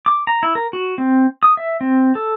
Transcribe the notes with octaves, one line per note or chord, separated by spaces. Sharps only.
D6
A#5
E4
A#4
F#4
C4
D#6
E5
C4
A4